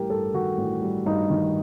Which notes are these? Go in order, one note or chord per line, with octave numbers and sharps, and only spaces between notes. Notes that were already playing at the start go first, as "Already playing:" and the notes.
Already playing: A1 G3 G4 A#4
G2 A4
D#3 F#4
A1
G3
G2 D#4
D#3